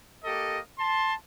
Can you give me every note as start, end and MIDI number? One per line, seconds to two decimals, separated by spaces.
0.24 0.58 58
0.24 0.58 67
0.24 0.58 69
0.24 0.58 75
0.78 1.13 81
0.78 1.13 84